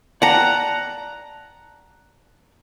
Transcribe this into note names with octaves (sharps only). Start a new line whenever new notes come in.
D5 F#5 G5 A5 A#5